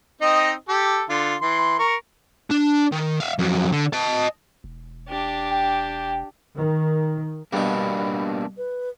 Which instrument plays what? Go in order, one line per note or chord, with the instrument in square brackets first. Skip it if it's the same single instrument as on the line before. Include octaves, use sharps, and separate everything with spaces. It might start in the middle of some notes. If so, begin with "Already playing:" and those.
[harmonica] C4 D#4 D#5
G4 A4
D3 F4
E3 C6
A#4 C#6
[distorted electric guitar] D4
D#3
E5 F5
F2 F#3
D3
D#5 A5
[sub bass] E1
[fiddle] D4 G4
[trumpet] G5
[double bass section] D#3
[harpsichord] G2 B2 [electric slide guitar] A#3 B3 D4 [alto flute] B5
[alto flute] B4